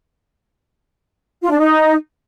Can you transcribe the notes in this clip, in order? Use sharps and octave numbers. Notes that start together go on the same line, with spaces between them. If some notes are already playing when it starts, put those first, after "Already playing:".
F4
D4
D#4